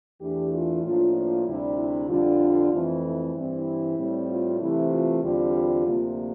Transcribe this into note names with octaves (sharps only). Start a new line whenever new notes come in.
E2 E3 A3 D4 G4
F4
A2 F3 A#3 D4 F4
F4
D2 C3 G3 D4 E4
E4
F2 D3 G3 D4 F4
F2 E3 A3 C4
E4
G2 E3 G3 C4 E4
A2 G3 C4
F4
C3 E3 A3 C4 E4
F4
E2 D3 G3 C4 F4
D2 C3 F3 A#3